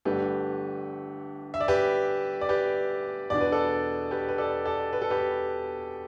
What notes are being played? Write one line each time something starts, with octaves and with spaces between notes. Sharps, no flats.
G1 G2 D3 A3 D4 G4 B4
E5
D5
G4 B4
D5
G4 B4
E2 B2 B3 D4 D5
B4
A4 D5
G4 B4
B4
A4 D5
A4 D5
B4
A4
G4 B4